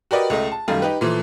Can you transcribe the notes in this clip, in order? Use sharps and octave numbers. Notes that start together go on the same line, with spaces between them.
F#4 G4 A#4 B4 D5 D#5
C#2 A3 D#5
A5
F#2 D#3 G3 A3 F5
D#4 G4 B4
A#2 E3 F3 A3